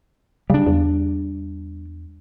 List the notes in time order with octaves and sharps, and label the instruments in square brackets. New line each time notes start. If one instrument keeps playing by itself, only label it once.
[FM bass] C#3 [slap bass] G3 D4
[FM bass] E2